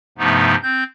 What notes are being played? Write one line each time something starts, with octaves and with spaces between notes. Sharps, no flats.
G2 C3 F3 A3 B3 D#4
C4 G6